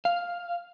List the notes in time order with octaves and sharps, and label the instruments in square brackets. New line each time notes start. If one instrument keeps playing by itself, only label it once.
[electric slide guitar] F5